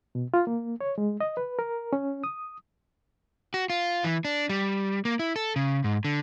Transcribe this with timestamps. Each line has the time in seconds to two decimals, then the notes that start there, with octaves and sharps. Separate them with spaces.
0.15 B2
0.34 F4
0.47 A#3
0.81 C#5
0.98 G#3
1.21 D#5
1.37 B4
1.59 A#4
1.93 C#4
2.24 D#6
3.54 F#4
3.70 F4
4.04 E3
4.25 D4
4.49 G3
5.05 A#3
5.19 E4
5.36 A4
5.56 C#3
5.84 G#2
6.05 D3